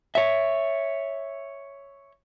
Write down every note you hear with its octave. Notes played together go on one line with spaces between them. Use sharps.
C#5 E5